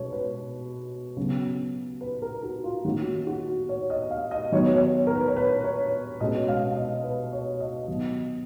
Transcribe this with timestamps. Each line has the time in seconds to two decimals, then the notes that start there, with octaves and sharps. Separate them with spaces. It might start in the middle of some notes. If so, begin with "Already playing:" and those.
Already playing: B2 G#3 C#4 C#5
0.13 B4
1.17 C#3 F#3 B3
2.01 B4
2.22 A#4
2.43 F#4
2.64 F4
2.85 D#3 A#3 C#4 F#4
3.27 F#4
3.69 C#5
3.90 D#5
4.11 F5
4.31 D#5
4.52 D#3 F#3 B3 C#5
4.74 C#5
5.07 A#4
5.15 B4
5.28 C#5
5.37 B4
5.64 C#5
6.20 B2 G#3 C#4 D#5
6.48 F5
6.76 D#5
7.04 B4
7.32 C#5
7.60 D#5
7.88 D#3 F#3 B3